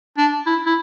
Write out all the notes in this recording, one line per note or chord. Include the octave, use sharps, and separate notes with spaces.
D4
E4
E4